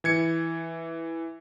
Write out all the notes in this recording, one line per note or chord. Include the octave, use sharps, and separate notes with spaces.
E3 G#6 C#7